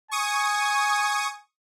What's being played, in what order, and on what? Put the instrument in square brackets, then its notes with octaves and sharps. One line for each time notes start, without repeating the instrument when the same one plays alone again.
[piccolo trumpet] G#5 [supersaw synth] C#6 D#6